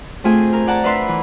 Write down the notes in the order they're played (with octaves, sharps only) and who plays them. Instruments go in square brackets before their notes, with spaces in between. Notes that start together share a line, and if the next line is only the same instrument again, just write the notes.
[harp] A3 C4 F4 G#4 G#5
A#4
D5 F#5 A5 A#5
D4 A#4 B4 E5 B5 C6
E3